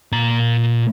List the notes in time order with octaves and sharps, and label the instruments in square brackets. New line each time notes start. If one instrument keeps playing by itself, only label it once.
[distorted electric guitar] A#2 A#5